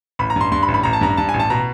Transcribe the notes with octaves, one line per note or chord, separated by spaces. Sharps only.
A1 B5
A#5
G2 C6
G2 C6
B5
A1
B5
A1 A#5
A5
G2 A#5
G2 A5
G#5
A1
A5
B2 A#5